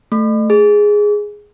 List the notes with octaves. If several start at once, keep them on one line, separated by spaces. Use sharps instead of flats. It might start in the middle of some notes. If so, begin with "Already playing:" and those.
A3
G#4